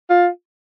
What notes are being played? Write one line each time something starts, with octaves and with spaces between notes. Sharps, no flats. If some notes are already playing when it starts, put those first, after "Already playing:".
F4